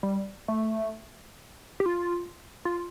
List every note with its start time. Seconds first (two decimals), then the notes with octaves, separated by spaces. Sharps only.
0.03 G3
0.48 A3
1.80 G4
1.86 F4
2.65 F4